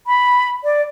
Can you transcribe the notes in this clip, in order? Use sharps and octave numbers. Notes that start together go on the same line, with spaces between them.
B5
D5